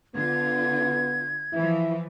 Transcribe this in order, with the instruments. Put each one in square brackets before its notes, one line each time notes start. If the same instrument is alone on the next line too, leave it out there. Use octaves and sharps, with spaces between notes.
[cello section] D3 F4 [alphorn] B3 [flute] G#6
[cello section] E3 F3 [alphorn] E4